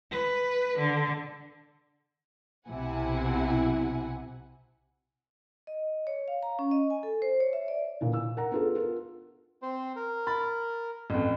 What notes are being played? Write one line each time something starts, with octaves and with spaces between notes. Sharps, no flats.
B4
D3
B1 C3 E4 F#5 G#5
D#5
C#5
F5
A#5
C#4
D#5
G#5
A4
C5
C#5
E5
D5
A#2 D3 E3
E6
A#4 F#5 A#5
B3 D4 F4 G#4 A4
F4 A#4
C4 C5
A#4
B5 A6
A1 F2